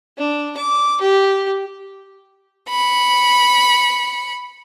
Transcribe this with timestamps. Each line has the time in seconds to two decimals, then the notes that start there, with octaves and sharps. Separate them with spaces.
0.17 D4
0.57 D6
1.00 G4
2.69 B5 C#7